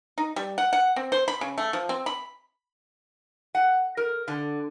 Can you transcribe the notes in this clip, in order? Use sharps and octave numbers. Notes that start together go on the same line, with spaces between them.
D#4
G3
F#5
F#5
C4
C5
B5
C#3
A3
F3
C4
B5
F#5
A#4
D3